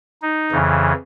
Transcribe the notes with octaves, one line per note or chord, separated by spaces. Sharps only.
D#4
F2 C#3 E3